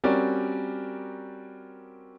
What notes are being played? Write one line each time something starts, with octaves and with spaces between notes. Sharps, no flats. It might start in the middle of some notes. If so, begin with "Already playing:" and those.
G3 C4 C#4 F#4 A#4 D5